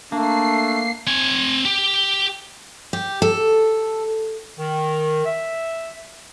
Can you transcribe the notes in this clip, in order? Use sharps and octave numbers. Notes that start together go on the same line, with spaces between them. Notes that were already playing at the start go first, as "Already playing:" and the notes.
A3 A#3 D4 C7
C4 G#5
G4
G4
A4
D#3
E5